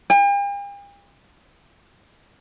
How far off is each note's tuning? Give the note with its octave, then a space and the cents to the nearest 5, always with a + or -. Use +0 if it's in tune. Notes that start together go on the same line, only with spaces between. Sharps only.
G5 +45